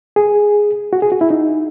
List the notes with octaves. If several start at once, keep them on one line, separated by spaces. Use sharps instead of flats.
G#4
F#4
G#4
F#4
E4
D#4